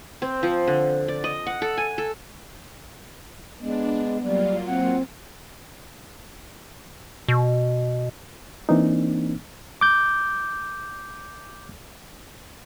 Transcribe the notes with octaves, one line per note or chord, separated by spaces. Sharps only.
C4
F3
D3
D5
D#5
F#5
A4
G#5
A4
G#3 B3 D4
F#3 G3 A#3 F4
C4 F#5
B2
E3 A#3 C4 D4 D#4
D6 G6